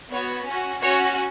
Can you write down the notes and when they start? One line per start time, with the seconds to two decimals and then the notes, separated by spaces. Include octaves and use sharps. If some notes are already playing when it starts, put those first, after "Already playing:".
0.11 B3 F#4 C#5
0.47 C#4 F#4
0.82 C#4 F#4 C#5